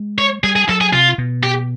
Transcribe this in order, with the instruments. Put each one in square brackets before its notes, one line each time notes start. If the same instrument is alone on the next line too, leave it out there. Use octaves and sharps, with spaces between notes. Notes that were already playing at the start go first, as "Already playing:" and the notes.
Already playing: [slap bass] G#3
[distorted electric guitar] C#5
[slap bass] G3 [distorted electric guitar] G#4
[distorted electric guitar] G#4
[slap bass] F#3 [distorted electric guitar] A4
[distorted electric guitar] G#4
[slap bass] C3 [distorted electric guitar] F4
[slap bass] B2
[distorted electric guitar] G4